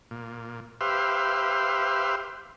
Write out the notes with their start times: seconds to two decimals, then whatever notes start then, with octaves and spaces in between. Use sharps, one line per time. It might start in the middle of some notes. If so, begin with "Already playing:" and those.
0.11 A#2
0.81 G4 B4 C5 E5 F5 C6